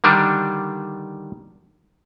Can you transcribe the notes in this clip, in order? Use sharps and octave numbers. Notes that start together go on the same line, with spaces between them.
D3 D#3 G3 D4